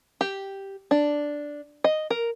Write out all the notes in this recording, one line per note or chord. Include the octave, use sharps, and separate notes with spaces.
G4
D4
D#5
A#4